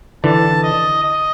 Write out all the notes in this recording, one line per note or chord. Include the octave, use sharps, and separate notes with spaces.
D3 E3 A5
D#5
D#5